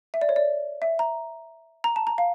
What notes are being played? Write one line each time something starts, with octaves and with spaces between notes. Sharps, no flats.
E5
D5
C#5
D5
E5
A#5
A#5
A5
A#5
F5